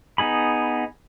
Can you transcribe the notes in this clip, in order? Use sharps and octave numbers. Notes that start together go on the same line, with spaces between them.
B3 D#4 G#4 B5